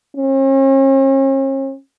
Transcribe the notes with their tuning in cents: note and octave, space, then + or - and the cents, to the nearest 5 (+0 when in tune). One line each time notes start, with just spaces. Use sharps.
C#4 -45